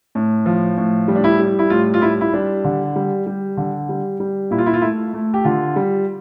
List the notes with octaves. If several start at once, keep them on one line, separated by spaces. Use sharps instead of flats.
A2
F3
A2
G3
D4
E4
G3
E4
A2 F4
F4
G3 E4
E4
G3 D4
D3
G3
G3
D3
G3
G3
A#2 E4
F4
E4
F4
A3 E4
A3
G4
D3 F4
G3